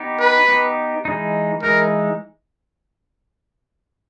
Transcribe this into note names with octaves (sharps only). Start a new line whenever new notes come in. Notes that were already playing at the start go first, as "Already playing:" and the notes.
Already playing: B3 D#4 G4
B4
B3 D#4 G4
E3 G#3 D#4
E3 G#3 D#4 A#4